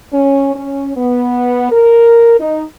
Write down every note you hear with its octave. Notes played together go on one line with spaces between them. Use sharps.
C#4
C#4
B3
A#4
D#4